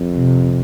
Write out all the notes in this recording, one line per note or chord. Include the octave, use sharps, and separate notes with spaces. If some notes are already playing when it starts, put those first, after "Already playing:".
Already playing: F2
C3